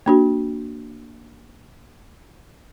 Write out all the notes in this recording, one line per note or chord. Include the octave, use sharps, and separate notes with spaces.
A#3 D4 F#4